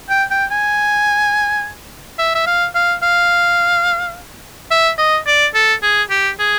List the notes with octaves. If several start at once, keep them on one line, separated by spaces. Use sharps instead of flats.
G5
G5
G#5
E5
E5
F5
F5
F5
E5
D#5
D5
A4
G#4
G4
G#4